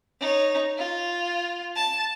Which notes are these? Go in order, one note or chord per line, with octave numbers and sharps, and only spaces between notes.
D#4 C#5
F4
A5